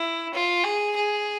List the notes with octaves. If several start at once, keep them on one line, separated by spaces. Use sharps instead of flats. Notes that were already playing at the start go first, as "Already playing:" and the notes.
Already playing: E4
F4
G#4
G#4